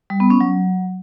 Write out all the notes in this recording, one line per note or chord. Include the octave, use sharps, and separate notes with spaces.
G3
B3
C#4
F#3